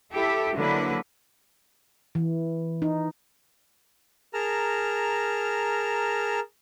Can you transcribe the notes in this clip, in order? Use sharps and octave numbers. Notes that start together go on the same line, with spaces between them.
E4 G4 A4 E5
D3 F#3 A#3 E4 B4
E3
D#4
G#4 A#4 A5 A#5 F6